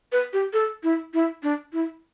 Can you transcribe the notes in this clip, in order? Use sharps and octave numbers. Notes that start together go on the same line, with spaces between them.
B4
G4
A4
E4
E4
D4
E4